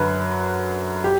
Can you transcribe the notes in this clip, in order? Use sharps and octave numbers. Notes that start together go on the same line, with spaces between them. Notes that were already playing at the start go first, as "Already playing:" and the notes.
Already playing: F#2 D3 F#3 B4
G4